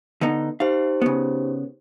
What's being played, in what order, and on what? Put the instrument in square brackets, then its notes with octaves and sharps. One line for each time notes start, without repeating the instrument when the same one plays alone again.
[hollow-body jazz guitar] D3 B3 D#4
[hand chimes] D#4 G4 C5 [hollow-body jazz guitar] F5
[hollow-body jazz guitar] C#3 B3